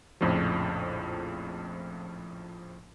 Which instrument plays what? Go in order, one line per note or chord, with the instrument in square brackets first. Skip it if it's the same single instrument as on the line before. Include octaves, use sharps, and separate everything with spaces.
[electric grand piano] A#1 F2 A2 C#3 F3